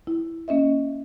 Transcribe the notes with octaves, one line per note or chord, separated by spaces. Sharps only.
E4
A#3 C#4 D#5 E5